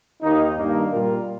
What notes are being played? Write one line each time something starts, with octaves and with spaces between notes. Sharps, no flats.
D#2 D#3 A#3 D#4
G2 D#3 A#3
A#2 G3 A#3 F4 A#4